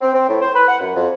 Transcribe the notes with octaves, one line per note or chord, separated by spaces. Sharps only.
C4
C4
A2
C5
B4
F#5
F#2
F2